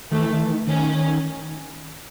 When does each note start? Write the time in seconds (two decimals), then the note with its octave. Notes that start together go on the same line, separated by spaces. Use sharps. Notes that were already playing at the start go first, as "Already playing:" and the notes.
0.11 D#3 A3
0.21 E3
0.31 D#3
0.40 E3
0.51 D#3
0.67 D#3 C#4